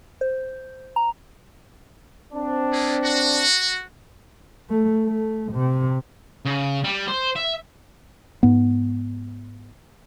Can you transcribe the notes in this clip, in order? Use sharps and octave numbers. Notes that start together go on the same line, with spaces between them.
C5
A#5
C4 D4
A3 A#3 G#4
F#4
A3
A3
C3
C#3
G3
C5
E5
G#2 B3